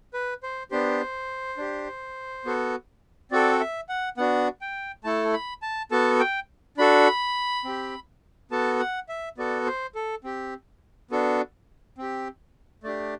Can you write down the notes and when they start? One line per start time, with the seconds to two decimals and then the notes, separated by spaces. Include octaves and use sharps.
0.14 B4
0.43 C5
0.71 B3 D4 G4 C5
1.57 D4 G4
2.45 B3 F#4 A4
3.31 C4 F#4 A4 D5
3.60 E5
3.89 F#5
4.17 B3 D4 F#4 F#5
4.61 G5
5.04 A3 E4 A4 A5
5.33 B5
5.62 A5
5.91 B3 F#4 A4 A5
6.20 G5
6.77 D4 F#4 A4 B5
7.65 C4 G4
8.51 B3 F#4 A4 A5
8.79 F#5
9.09 E5
9.38 B3 F#4 A4 D5
9.66 C5
9.95 A4
10.24 C4 G4
11.11 B3 D4 F#4 A4
11.98 C4 G4
12.84 A3 D4 G4 D5